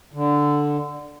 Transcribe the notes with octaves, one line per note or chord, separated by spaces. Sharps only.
D3